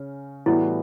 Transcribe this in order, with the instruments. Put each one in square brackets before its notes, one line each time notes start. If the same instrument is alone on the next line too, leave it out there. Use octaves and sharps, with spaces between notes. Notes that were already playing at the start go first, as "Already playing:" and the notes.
Already playing: [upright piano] C#3 C#4
[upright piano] A2 E3 G3 B3 F#4 [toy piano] E4